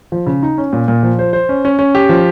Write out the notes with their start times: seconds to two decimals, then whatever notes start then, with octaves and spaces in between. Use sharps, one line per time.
0.12 F3
0.26 C#3
0.43 D#4
0.58 C#4
0.73 A#2
0.88 A#2
1.03 F3
1.19 C5
1.33 C5
1.49 C#4
1.65 C#4
1.79 C#4
1.95 G4
2.09 F3